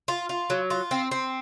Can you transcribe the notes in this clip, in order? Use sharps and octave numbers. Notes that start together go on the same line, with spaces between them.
F4
F4
F#3
F4
C4
C4